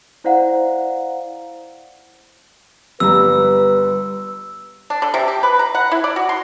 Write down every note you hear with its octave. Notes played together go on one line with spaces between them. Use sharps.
E4 C5 D5 F5 F#5 A#5
G1 G3 B4 A#5 E6
D4
D3
C3
G4
B4
A#5
F#5
E4
D5
F#4
C6